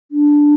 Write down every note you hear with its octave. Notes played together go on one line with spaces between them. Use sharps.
D4